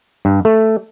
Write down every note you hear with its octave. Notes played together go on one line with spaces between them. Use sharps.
G2
A3